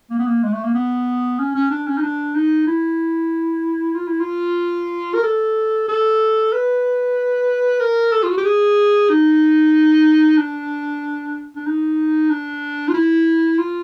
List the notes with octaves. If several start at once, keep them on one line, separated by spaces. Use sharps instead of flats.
A#3
B3
A#3
G#3
A3
A#3
B3
C#4
C#4
D4
C#4
D#4
D4
D#4
E4
F4
E4
F4
A#4
A4
A4
B4
A#4
A4
F4
F#4
G4
G#4
D#4
D4
D4
D#4
D4
F4
E4
F4